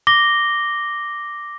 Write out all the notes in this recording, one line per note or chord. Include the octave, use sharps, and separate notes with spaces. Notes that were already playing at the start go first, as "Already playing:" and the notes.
D6 A#6 G7